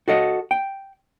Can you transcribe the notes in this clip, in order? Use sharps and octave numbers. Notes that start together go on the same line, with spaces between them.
F#4 A4 D#5
G5